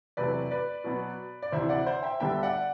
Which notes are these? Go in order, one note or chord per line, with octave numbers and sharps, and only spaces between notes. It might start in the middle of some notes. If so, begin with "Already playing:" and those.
E2 C3 F#3 A3 B4 D5
B4 D5
B2 F#3 B3
D5
D2 C3 E3 C5 E5
D5 F#5
C5 E5
E5 G5
D2 D3 G3 B3 D4 E5 G5
D5 F#5